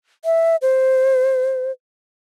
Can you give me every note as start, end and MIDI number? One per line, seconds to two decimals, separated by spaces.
0.25 0.56 76
0.62 1.71 72